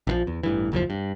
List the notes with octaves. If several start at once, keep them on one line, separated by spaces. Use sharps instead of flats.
A#1 D#3 F3
E2
A1 G2 E3
F#1 D#2 A#2 F3
G2